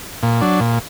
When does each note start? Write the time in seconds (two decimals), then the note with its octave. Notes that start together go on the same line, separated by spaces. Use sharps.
0.23 A#2
0.41 F#3 D4
0.60 A#2